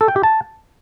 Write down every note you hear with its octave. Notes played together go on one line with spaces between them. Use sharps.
A4
G5
G4
A5